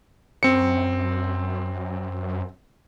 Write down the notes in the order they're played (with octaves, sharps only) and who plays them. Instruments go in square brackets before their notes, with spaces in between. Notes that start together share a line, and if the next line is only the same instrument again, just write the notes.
[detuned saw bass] F#2 [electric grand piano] C4 C#7